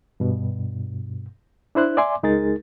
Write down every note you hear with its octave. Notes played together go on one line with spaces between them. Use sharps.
G2 B2
D4 E4 C5 F#6
D5 E5 G#5 C6 D6
C#2 G#3 D#4 G#4 A#4 A6